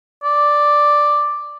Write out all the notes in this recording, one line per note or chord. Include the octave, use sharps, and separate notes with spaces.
D5